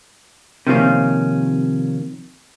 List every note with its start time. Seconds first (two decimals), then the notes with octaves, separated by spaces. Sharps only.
0.67 C3 D#3 F3 A#3 C#4